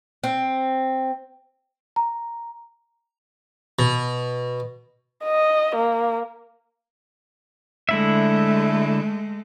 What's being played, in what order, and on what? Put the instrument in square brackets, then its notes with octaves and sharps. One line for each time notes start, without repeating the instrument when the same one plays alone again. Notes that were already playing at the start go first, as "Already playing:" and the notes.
[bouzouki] C4
[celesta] A#5
[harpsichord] B2
[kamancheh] D#5
A#3
[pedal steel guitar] D3 E4 E5 [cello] G#3 A3